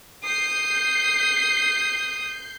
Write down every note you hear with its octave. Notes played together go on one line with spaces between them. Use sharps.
D#6 G6 C7